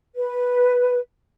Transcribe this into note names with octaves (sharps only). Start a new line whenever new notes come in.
B4